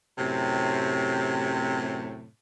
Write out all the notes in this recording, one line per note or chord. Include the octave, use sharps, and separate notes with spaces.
F#2 A2 C3